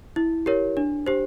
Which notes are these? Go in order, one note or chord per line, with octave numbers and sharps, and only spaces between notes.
E4
G4 A#4 C#5
D4
G4 C5